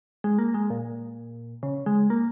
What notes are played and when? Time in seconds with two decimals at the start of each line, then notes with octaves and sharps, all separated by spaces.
0.24 G#3
0.39 A#3
0.54 G#3
0.70 A#2
1.63 C#3
1.86 G#3
2.10 A#3